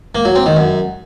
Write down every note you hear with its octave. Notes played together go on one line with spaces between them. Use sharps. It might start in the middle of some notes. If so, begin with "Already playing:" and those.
A#3
F#3
C4
D#3
F#2